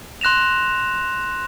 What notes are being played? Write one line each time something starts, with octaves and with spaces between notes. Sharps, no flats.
C6 F#6 A#6 E7 F7